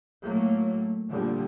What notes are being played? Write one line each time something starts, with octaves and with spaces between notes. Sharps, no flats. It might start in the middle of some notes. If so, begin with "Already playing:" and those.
A2 F#3 A3 A#3
A#2 D3 F3 G3